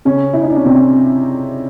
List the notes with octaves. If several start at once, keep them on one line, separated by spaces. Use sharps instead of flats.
C#3 C#4
E4
D#4
D4
C#4
C3 C4